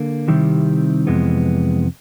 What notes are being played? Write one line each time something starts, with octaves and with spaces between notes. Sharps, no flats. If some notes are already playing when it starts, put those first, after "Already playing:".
Already playing: D3 A#3
C3 D#3 G3 C4 E4
F2 C3 E3 G#3 B3